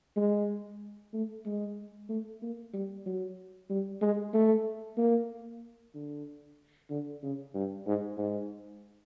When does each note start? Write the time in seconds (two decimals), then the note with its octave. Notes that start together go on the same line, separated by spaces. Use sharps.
0.17 G#3
1.13 A3
1.46 G#3
2.09 A3
2.42 A#3
2.74 G3
3.06 F#3
3.70 G3
4.02 G#3
4.34 A3
4.97 A#3
5.95 D3
6.90 D3
7.23 C#3
7.55 G2
7.87 G#2
8.18 G#2